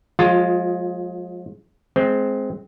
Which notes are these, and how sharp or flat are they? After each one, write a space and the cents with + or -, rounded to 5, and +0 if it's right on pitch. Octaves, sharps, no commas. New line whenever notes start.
F3 +45 G#3 +5 F4 +15
G#3 +20 C4 +0